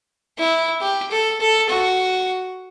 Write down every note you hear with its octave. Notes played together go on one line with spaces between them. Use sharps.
E4
G4
A4
A4
F#4